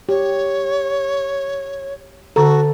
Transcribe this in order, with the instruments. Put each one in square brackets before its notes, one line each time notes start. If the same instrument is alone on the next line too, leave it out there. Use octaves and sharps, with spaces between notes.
[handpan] G4 [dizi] C#5
[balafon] D3 A#5 [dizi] F#4 [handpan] A4